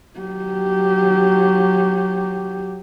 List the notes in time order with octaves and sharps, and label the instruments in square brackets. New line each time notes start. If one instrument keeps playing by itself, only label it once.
[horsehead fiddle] F#3 G4